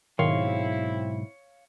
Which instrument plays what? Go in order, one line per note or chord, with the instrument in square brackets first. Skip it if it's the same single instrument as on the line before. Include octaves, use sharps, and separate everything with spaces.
[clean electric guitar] B1 G#2 C6 [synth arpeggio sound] D#3 [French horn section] C4 E4 [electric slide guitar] C#5 F5